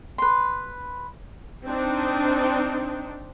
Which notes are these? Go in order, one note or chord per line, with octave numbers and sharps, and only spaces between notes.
B4 C6
C4 D4 D#4